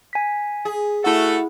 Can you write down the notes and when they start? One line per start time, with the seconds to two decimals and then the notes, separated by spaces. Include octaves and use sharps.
0.13 G#5 B6
0.65 G#4
1.04 A3 E4 F#4 A4 F#5